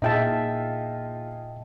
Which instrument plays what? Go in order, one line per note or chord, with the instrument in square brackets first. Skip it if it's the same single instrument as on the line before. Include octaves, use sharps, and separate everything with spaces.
[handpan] A#2 E5 [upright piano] D#4 F4 G#4 [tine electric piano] D#5 G5 A5